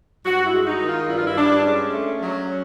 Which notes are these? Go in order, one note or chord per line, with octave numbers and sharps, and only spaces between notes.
G2 F#4
E4
G#3
D#4
D#3
F4
G2 E4
F4
E4
G2 D4
G#3 C#4
A3
F#3